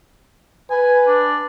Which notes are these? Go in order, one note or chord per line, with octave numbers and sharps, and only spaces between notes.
B4 G#5
D4